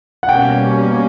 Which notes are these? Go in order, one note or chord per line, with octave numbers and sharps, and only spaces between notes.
F#5
B2 G3 A#3 C#4 G5